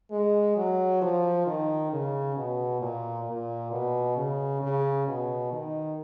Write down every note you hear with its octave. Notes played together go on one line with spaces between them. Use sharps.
G#3
F#3
F3
D#3
C#3
B2
A#2
A#2
B2
C#3
C#3
B2
D#3